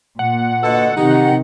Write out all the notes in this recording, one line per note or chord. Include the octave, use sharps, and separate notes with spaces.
A#2 F#5
D3 F4 F#4 A4 B4 D#5
C3 D#3 D#4 G4